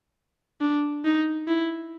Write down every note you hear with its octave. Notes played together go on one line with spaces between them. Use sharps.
D4
D#4
E4